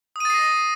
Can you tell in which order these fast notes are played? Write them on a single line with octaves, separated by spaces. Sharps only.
D#6 D#7 A6 C7 A#6